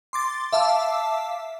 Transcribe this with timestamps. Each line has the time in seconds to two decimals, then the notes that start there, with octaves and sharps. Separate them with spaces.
0.13 C6 D6 A6
0.53 E5 F5 A5 D6 E6